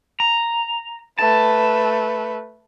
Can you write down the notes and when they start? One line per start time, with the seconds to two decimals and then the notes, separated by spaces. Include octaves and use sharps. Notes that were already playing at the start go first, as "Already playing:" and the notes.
0.20 A#5
1.19 A3 B4 A5